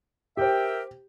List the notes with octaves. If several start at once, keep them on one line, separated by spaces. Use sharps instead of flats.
G4 A#4 C5 E5 G5